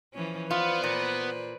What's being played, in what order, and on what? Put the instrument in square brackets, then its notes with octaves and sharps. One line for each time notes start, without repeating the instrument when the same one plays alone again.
[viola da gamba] E3 F3 C#4
[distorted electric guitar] B3 [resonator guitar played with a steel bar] F4 [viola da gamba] B4 C5 D5
[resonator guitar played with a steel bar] A#2